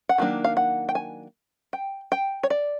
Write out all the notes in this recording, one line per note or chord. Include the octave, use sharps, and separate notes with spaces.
F#5
D#3 F#3 A#3 D4
F5
F#5
G5
G#5
G5
G5
C#5
D5